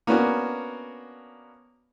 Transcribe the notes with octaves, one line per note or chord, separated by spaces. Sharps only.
A#3 B3 C#4 D4 F#4